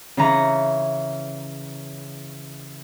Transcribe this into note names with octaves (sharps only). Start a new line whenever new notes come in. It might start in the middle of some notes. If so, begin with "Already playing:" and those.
C#3 E3 A#5